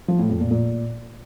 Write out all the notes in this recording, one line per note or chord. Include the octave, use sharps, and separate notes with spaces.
F3
A2
F2
A#2
A#2